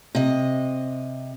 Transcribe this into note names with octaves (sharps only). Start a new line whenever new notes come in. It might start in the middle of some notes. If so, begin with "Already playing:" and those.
C3 D#5